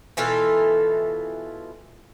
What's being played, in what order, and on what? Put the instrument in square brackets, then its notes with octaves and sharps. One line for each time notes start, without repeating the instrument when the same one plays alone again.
[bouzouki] B2 E3 F4 A4